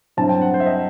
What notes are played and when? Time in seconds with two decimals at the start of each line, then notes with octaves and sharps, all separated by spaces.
0.17 G2 F#3 C4 E4 A5
0.29 G5
0.42 F#5
0.54 C5
0.60 E5
0.66 D#5